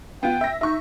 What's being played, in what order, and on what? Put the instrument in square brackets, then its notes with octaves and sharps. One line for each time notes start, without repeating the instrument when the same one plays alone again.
[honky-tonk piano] B3 F4 [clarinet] G5
[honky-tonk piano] E5 A#6
[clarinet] D#4 [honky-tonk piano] E5 C#6